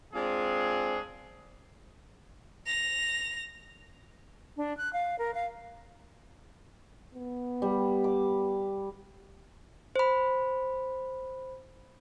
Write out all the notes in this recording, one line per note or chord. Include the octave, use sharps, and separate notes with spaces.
G#3 C4 D4 F4 G#4
A#6 F7
D4
F#6
F5
A#4
F5
B3
G3
D6
C5 B5